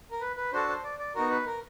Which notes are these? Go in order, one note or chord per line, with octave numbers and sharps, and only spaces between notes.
A#4
B4
B4
D4 F#4 A4 C5
C5
D5
D5
B3 D#4 F#4 A#4
B4
A#4